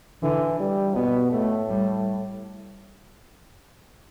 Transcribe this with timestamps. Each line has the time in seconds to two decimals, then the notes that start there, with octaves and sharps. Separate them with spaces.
0.23 D3 E3
0.60 G3
0.96 B2 B3
1.32 A2 A3
1.69 G3